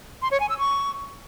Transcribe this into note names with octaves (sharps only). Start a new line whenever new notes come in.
C6
C#5
G#5
E6
C#6